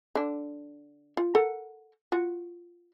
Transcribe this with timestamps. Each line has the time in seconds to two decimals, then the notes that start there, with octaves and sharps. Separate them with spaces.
0.15 D3 D4
1.17 F4
1.35 A4 A#4 F#5
2.12 F4 F#4